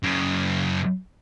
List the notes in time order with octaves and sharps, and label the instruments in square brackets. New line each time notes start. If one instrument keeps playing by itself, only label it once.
[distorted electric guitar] F#2 C#3